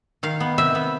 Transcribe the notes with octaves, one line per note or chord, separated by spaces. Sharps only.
D#3 F5
B3
C3 E5
B3